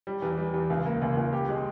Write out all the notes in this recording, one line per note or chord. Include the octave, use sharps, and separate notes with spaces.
G3
E2
G3
E2
C#2
A#3
C#2
C#2
G4
G#3